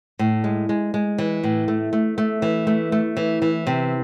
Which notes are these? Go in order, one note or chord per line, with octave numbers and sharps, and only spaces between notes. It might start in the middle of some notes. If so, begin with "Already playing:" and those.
A2
G#3
G#3
G#3
E3
A2
A3
A3
A3
E3
A3
A3
E3
E3
C3